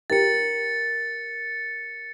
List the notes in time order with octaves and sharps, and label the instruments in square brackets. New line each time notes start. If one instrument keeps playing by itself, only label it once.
[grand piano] G4 A#4 [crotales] A6 C#7